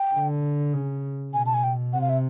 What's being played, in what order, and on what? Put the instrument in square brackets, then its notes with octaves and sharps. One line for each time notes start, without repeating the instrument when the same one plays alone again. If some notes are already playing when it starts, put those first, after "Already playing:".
Already playing: [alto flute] G5
[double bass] D3
C#3
[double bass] B2 [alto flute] G#5
[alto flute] A5
G#5
G5
[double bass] C3 [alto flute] F#5
[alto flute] F5
E5